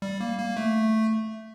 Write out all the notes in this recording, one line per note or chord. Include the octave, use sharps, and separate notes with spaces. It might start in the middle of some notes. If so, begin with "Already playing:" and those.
G3
A#3
A#3
A3